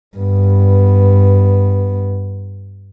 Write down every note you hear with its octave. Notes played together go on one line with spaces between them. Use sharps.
G2 B3